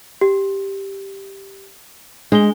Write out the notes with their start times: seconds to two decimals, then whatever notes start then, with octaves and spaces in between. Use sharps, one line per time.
0.21 G4
2.32 G#3 D4 G#5 G7